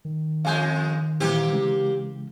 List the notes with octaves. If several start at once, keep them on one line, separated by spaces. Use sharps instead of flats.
D#3
F2 G#3 F5 G#5 G6
A#2 E3 G3 A#3 C4 G4
C#3 E3 G#3